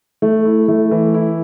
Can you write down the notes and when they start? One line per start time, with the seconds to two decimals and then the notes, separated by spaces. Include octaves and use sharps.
0.22 A3
0.45 E4
0.68 A3
0.91 E3
1.14 E4